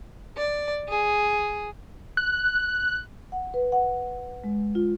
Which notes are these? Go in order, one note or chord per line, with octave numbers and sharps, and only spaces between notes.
D5
G#4
F#6
F#5
B4
F#5
G#3
F4